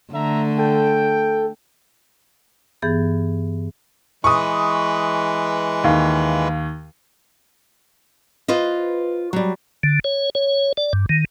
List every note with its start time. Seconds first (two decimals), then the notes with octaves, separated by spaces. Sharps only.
0.13 D3 A3 E5 A#5
0.58 A4 G5
2.82 G2 E3 B3 G#4 G6 A6
4.24 E3 G#3 B4 C#6 D#6
5.84 D#2 F5
8.48 F4 B4 C5 D#5
9.33 F#3 G3
9.83 D3
10.04 C#5
10.35 C#5
10.77 D5
10.93 G2
11.09 D#3